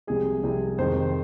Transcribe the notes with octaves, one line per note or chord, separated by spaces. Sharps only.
C2 C3 F3 G#3 G#4
C2 C3 F3 G#3
F2 C3 D#3 G#3 C5